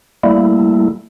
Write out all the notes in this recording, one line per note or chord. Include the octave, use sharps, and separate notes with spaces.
G3 A3 A#3 E4